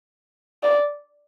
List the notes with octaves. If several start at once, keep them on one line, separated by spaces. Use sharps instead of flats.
D5